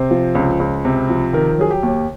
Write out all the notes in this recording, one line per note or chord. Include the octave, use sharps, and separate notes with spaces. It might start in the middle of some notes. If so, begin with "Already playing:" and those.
Already playing: C3 C5
F3
C#2
C#2
C3
F3
D#3 A#4
F#3 G#4
G4
D#2